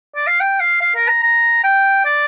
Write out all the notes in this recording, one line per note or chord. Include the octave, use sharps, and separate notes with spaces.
D5
F5
G5
F5
F5
A#4
A#5
A#5
G5
D5